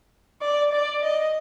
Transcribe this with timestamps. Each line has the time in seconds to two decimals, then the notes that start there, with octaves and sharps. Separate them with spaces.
0.41 D5
0.72 D5
1.02 D#5